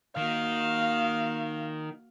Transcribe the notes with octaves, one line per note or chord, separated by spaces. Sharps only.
D#3 A#3 F#4 F5